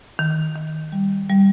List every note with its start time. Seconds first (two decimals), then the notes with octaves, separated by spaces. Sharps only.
0.19 D#3
0.56 D#3
0.92 G3
1.29 G3